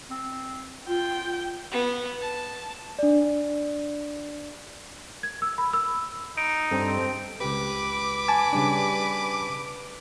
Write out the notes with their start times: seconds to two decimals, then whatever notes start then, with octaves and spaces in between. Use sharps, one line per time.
0.10 C4
0.88 F4 G5
1.72 B3
2.21 A5
2.99 D4 D5
5.23 G#6
5.42 E6
5.58 B5
5.73 E6
6.38 D#4 D7
6.71 G2 C4 A4
7.41 C#2 G4 B4 D6
8.28 G#5 A5
8.53 C#3 G3 D4